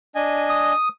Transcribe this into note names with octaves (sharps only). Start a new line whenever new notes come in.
D4 D#5 G#5
D#6